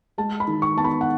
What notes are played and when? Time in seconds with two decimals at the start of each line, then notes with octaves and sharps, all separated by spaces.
0.18 G#3 A5
0.40 B5
0.47 D#3
0.62 C#6
0.77 B3 A5
0.84 B5
1.01 F#5